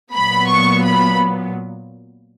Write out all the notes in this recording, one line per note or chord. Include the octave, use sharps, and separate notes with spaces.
A#2 F#3 B3 B5
C#6
B5